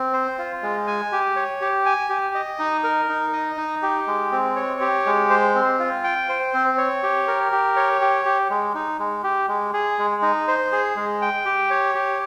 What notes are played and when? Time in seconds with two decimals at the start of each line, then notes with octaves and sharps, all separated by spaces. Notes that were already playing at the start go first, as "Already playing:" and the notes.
Already playing: C4
0.13 C5
0.38 F4
0.63 G#3
0.87 G#5
1.12 G4
1.36 C#5
1.61 G4
1.86 G#5
2.10 G4
2.35 D#5
2.59 D#4
2.84 A#4
3.09 D#4
3.33 D#5
3.57 D#4
3.82 G4
4.07 G#3
4.32 C4
4.56 C#5
4.80 G4
5.06 G#3
5.30 C5
5.55 C4
5.80 F4
6.04 G5
6.29 C5
6.54 C4
6.78 C#5
7.03 G4
7.28 A#4
7.52 G4
7.76 C#5
8.01 G4
8.25 G4
8.50 G#3
8.75 D#4
8.99 G#3
9.24 G4
9.48 G#3
9.73 G#4
9.99 G#3
10.22 D#4
10.48 C5
10.72 G#4
10.96 G#3
11.22 G5
11.45 G4
11.70 C#5
11.95 G4